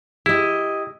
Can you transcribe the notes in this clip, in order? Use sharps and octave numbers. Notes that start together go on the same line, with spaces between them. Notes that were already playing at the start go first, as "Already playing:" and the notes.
E4 G4 D#5